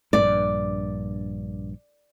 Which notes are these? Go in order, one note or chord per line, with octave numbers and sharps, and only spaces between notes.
A#1 G2 D5